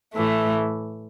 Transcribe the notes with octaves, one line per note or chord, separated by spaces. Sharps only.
A2 E3 A3